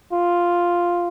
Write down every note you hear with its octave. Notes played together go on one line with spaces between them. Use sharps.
F4